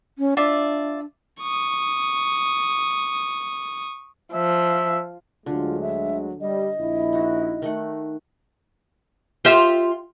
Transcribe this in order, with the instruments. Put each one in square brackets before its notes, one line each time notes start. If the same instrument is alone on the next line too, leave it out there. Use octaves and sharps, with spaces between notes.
[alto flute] C#4
[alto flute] D4 [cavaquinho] F4 D5 E5
[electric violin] C#6 D#6
[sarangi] F3 [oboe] E5
[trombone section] D2 F#3 G#3 [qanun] D3 [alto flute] F4
[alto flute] E5
[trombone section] G3 [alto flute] D#5
[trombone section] A#1 E4
[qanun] D#4 F#4
D#3 A3 F#5
[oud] F4 G4 E5